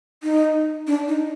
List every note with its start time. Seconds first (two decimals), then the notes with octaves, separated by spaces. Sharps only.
0.23 D#4
0.87 D4
1.08 D#4